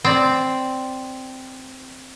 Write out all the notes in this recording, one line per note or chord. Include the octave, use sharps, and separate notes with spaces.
C4 D5